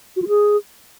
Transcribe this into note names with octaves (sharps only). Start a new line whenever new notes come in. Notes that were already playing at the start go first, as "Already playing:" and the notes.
F#4
F4
G#4